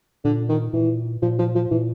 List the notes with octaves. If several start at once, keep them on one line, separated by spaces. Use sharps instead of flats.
A#2 D3
D#3
A#2 E3
A#2 F3
F3
F3
A#2 E3